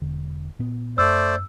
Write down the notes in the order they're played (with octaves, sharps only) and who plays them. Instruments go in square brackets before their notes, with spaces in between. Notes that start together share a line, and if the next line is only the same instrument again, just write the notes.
[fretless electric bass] E1 D3
A#2 B3
[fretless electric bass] F#2 [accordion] A3 C5 D5 [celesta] E6